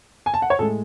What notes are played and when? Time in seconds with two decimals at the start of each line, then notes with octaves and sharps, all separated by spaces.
0.26 G#5
0.34 A5
0.42 F#5
0.50 C#5
0.59 A2 G#3 A4